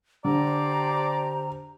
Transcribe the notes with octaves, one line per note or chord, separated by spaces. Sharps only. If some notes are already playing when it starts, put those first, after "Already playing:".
D3 D4 G4 C5 D5 A#5